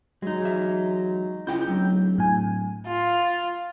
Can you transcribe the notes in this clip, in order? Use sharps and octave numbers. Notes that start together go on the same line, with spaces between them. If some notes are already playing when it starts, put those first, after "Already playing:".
F#3 G#3 D#4
E2 E5
C#2 E4 F#5 G5 G6
D1 F#3
A2 G#5
F4